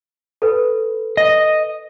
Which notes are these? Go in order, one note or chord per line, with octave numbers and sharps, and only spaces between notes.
A4 B4
D#5